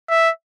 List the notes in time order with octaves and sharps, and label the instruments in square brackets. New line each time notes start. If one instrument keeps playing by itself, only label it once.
[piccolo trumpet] E5